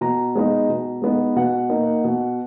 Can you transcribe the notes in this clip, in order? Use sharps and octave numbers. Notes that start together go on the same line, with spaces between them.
B2 A#5
G#3 B3 D#4
B2
G#3 B3 D#4
B2 F#5
A#3 D#4
B2